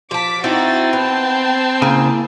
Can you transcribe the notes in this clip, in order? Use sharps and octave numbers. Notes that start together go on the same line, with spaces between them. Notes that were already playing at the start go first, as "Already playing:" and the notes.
F3 A5 D6 B6
C4 D#4 E4 F#4 A6
B3 G5 A5
C#3 A#3 E4